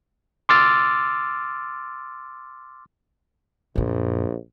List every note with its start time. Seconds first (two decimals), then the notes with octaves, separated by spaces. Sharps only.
0.49 C6 D6 E6 F6 A6
3.76 A#1 F#2 A#2